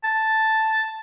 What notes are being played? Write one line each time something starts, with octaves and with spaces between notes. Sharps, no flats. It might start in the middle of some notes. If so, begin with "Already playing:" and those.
A5